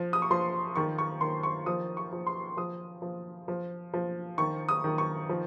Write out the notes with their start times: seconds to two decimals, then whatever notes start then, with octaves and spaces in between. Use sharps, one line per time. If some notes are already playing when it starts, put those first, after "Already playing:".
Already playing: F3
0.13 D#6
0.22 C#6
0.31 F3 C6
0.76 D#3 C#6
0.98 C#6
1.21 D#3 C6
1.43 C#6
1.66 F3 D#6
1.97 C#6
2.13 F3
2.27 C6
2.57 F3 D#6
3.02 F3
3.48 F3
3.94 F3
4.38 D#3 C#6
4.69 D#6
4.84 D#3
4.98 C#6
5.29 F3